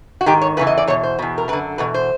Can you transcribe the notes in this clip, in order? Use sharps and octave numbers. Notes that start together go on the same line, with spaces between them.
F#4
G#2 D#3 G4
C#5
E2 C#3 E3 B4
D#5
D5
E2 B2 C#5
C5
E2 B2
A#4
F#2 B4
D3
E2 B2 B4
C5